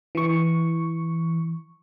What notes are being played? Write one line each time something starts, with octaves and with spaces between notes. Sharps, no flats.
E3 C#6